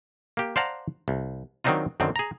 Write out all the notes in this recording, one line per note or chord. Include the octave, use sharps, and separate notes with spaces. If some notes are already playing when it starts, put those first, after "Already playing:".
A#3 G4
C5 D5 F5 F#5 A5 A#5
C2
D#3 F#3 C4 D4 D#4 F4
F#2 D3 D#3 C4
G#4 A#5